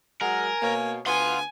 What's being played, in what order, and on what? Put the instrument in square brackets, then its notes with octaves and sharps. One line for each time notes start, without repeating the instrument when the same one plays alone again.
[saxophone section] F#3 G#3 F#5 [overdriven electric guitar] A#4 [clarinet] G#5
[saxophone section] B2 A#3 [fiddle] C#5
[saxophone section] D2 B3 F#5 [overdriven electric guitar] F5 C6 [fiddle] G#5